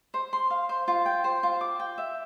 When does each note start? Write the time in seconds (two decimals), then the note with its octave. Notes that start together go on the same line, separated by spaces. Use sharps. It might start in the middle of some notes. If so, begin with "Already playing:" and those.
0.14 C5
0.33 C6
0.51 F5
0.69 C5
0.88 F4
1.06 G5
1.24 C5
1.43 F4
1.61 D6
1.80 G5
1.98 E5